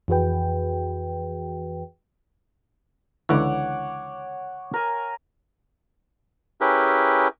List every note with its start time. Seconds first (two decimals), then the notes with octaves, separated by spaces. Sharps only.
0.08 F2 E3 F#4 G#4 B4 G5
3.29 C#2 D3 E3 C#5 F#5 D6
4.74 A#4 G#5
6.61 C#4 E4 G4 G#4 A#4 B4